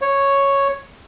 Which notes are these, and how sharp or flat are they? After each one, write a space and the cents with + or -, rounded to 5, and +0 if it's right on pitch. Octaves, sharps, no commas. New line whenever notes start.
C#5 -5